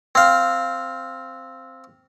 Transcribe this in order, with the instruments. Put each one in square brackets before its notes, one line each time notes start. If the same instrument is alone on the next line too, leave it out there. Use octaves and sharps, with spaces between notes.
[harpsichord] C4 F5